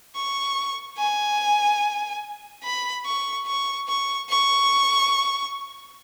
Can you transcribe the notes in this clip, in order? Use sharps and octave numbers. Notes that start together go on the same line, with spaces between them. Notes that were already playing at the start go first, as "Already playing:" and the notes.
C#6
G#5
B5
C#6
C#6
C#6
C#6